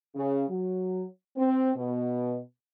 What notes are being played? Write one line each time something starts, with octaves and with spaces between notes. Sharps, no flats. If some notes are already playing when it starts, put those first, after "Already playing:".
C#3
F#3
C4
B2